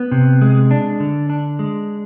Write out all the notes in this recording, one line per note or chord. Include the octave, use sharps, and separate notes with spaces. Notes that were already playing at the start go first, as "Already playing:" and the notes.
Already playing: B3
C3
G#3
D4
D3
D4
G#3